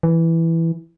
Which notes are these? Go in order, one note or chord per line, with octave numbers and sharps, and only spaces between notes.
E3